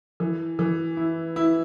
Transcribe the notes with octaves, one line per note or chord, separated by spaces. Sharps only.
E3
E3
E4
E4